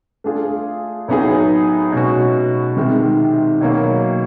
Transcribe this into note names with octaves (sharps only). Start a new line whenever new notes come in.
A3 D4 F4 G#4
A2 F#3 B3 D#4 G#4
B2 G#3 C#4 F#4
C3 D#3 G#3
B2 F#3 A#3